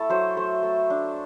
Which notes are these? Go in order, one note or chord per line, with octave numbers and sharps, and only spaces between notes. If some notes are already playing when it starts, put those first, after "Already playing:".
Already playing: A3 E4 A4
F#3 C5
A3 C5
A3
D4